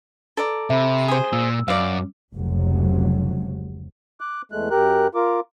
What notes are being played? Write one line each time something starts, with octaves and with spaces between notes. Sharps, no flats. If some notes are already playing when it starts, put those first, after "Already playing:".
A4 D5 A#5
C3 E5 B5
G#4 C5 D#6
A#2 E6
F#2 D5 F5
F1 C#2 C3 F#3
D6 F#6
E2 G#3 A3 F#6
F#2 G4 A#4 F#6
F4 A#4 D6